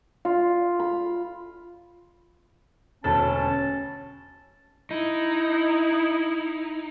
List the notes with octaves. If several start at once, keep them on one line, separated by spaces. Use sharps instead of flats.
F4
B5
E1 D2 C#4 A4 A5
D#4 E4